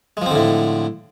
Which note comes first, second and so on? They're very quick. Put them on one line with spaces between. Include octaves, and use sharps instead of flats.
G#3 F3 C4 D3 A2